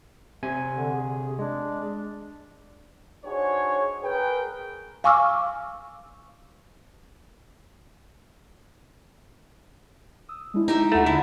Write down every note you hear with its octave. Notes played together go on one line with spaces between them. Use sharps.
C3 G#5
D3
G#4
G#3 D4
D4 D#4 F#4 G#4 C5 C#5
G#4 A#4 B4 G5
F5 G#5 C#6 D6 E6 F6
D#6 E6
G#3 D4 E4
D#4 G4 E5
D#2 A3 F4 F#5 B5
D3 E4